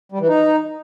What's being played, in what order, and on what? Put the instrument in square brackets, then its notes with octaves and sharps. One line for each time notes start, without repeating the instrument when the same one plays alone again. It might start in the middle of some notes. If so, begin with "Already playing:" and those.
[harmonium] G3
E3
D#4